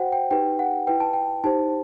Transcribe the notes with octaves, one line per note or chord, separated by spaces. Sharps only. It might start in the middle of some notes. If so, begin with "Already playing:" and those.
Already playing: F#4 C5 F#5 G5
G5
D#4 G4 B4 G5
F#5
E4 B4 G5
A5
G5
D#4 G4 C5 A5